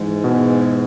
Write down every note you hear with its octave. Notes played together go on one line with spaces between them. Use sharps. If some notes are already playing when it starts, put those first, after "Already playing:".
Already playing: G#2 E3 G#3
B2